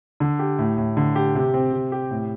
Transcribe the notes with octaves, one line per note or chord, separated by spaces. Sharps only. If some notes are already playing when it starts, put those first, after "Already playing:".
D3
G4
A2
A2
D3
G4
C3
C4
C3
G4
A2